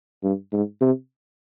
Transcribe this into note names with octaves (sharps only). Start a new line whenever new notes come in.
G2
G#2
C3